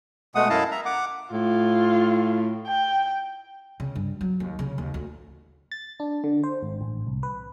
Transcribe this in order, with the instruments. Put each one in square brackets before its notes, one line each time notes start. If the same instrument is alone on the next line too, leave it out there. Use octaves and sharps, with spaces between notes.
[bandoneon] B2 G#3 A3 F#5 D#6
F#2 E4 D#5 F5 A5
E5 A#5
F#5 D6
[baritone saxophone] A2 [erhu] F4
[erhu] G5
[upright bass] C#3
G2
F#3
D#2
C#3
D#2
D2
[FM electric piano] A6
D4
D3
C5
G#1
A1
C2
B4